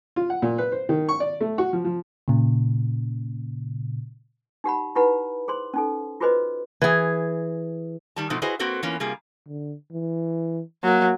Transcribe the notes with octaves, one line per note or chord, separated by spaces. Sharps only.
F4
F#5
A#2
B4
C5
D#3
C#6
D5
A3
F#4
F3
F3
A#2 C#3
D#4 G4 F#5 B5
D#4 E4 G4 B4 F#5 B5
G#4 C5 C6
C#4 D#4 A4
F4 F#4 G#4 B4 C5 D#5
E3 G#4
D#3 G3 A5
G#2 B2 F3 A3 C4 D#4
E4 F#4 G#4 B4 C5 D#5
A#3 C4 F#4 A4 B4 C5
E3 A#3 B3 C#4 F4
C3 G3 A#3 F4 G#4
D3
E3
F#3 A#3